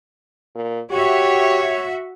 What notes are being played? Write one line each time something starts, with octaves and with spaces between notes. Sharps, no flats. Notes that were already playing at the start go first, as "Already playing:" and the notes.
A#2
F#4 G4 C#5 E5